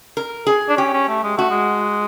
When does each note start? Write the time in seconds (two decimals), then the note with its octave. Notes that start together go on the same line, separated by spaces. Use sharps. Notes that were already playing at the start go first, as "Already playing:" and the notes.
0.17 A#4
0.47 G#4
0.69 D4
0.77 C#4 G4
0.93 C#4
1.08 A3
1.24 G#3
1.37 A3 F#4
1.51 G#3